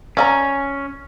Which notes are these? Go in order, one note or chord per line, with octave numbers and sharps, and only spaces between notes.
C#4 D5 F5 A#5